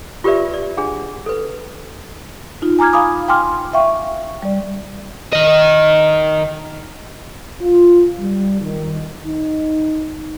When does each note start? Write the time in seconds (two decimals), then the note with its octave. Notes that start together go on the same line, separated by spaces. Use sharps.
0.24 F4 G4 A#4 B4 D5 E5
0.54 D5
0.77 D4 G#4 F#5
1.26 A4 B4
2.62 D#4 F4
2.79 G#5 A#5 D6 F6 G#6
2.93 F5 G#5 B5 D6 D#6
3.28 G5 G#5 C6 D6 F6
3.73 E5 F5 G5 C#6
4.43 G3 D5
5.33 D#3 D#5
7.61 F4
8.19 G3
8.61 D#3
9.26 D#4